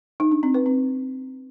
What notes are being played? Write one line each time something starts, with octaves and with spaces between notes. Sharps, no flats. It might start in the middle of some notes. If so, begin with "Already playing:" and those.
D#4
D4
C4
B4
C4